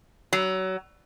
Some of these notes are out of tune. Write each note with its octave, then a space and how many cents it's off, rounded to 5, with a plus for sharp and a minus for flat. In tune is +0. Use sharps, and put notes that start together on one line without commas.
F#3 +25